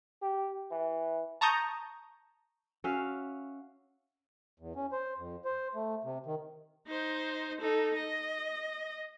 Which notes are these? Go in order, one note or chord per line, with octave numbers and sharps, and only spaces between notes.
G4
E3
A5 A#5 C#6 D#6 G6
C#4 F#4 E5 F5
E2
C#4
C5
F2
C5
A3
C3
D#3
D#4 C5
D#4 A4
D#5